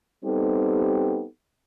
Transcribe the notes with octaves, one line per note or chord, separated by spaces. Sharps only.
G3 B3 C4 D#4 G4 A4